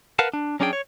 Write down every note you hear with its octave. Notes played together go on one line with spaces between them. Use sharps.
A#4 B4 F5 F#5 A5
D4
F#3 C#4 D4 G#4 G5
C#5